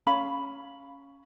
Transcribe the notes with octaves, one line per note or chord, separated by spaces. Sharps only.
C#4 F5 B5